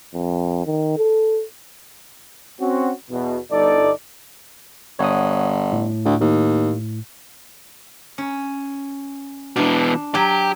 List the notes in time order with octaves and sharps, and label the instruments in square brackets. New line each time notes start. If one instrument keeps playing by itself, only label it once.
[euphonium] F2
D#3
A4
[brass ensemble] C4 C#4 F#4
E2 B2
G1 D#4 A4 D5
[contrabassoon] G1 [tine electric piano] C#5 F#5 D#6
[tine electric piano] A2
[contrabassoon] D2
D#2
[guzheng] C#4
[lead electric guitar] B2 E3 [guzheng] D4
[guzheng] F#3 [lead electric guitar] G4